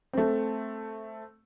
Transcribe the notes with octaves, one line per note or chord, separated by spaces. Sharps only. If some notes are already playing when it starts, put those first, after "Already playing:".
A3 C4